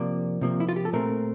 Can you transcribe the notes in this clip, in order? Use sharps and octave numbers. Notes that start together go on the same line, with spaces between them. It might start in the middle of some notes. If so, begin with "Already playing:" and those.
Already playing: C3 F3 A#3 D5
C3 F3 A#3
E4
F4
G4
A4
A#2 A3 C4 A#4